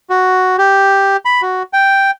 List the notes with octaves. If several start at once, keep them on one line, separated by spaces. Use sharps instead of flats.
F#4
G4
B5
F#4
G5